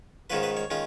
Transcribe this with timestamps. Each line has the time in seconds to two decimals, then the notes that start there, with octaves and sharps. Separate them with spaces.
0.30 G#2 D#3 G#3 C#4 F4 B4
0.43 B4
0.57 C#5
0.70 D#3 G#3 C#4 F4